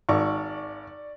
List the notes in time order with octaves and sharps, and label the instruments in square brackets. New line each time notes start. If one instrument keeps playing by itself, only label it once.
[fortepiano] G#1 [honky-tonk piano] D5 C#6